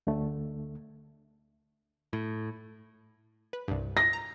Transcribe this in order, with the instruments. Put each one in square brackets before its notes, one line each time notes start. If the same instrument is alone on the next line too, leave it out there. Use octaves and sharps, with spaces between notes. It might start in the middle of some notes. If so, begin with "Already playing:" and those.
[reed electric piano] D2 D3 A3
[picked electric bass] A2
[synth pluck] B4
C2 G2
[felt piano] A#6
[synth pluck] A#5